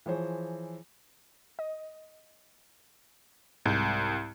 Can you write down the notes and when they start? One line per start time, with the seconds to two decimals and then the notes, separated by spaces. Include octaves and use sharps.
0.06 E3 F3 G#4 C5 C#5
1.59 D#5
3.65 C2 G#2 G6